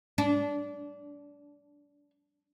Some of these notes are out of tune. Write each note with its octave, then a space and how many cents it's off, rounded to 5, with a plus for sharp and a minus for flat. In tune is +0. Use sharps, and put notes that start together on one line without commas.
D4 -20